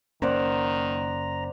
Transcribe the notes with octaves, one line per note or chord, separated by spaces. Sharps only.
F#1 D#3 A#3 C#4 C5 D5 F#5 A#5